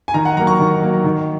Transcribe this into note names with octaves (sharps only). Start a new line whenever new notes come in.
G#5
D#3 A#5
F#5
F#3 A#3 A#5
C#6
D#3
F#3 A#3
D#3